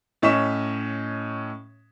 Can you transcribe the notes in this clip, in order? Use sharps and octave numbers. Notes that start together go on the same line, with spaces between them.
A2 C#4 C#5 D#5 B6 E7